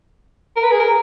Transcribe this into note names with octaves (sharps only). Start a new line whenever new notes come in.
A#4
B4
G#4
A#4